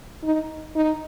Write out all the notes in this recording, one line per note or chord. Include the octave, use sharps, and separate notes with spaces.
D#4
D#4